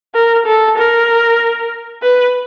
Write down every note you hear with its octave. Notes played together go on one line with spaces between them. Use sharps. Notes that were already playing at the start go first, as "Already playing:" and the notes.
A#4
A4
A#4
B4